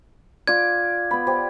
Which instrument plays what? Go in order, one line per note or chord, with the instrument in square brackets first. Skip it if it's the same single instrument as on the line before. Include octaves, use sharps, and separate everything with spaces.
[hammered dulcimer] F4 D5 [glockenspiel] G#6
[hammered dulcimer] B3 B5
G4 C5